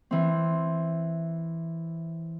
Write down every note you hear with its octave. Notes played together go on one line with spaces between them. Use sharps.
E3 C4